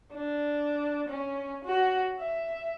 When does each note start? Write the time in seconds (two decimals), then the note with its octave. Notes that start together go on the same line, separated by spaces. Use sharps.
0.13 D4
1.08 C#4
1.64 F#4
2.20 E5